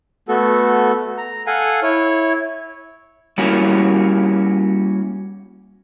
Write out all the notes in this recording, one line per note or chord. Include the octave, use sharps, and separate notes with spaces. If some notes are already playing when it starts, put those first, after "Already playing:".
A3 B3 F#4 A4
A#5
A4 F5 F#5 G#5
E4 C#5
G3 A#3 C#4 E4 F#4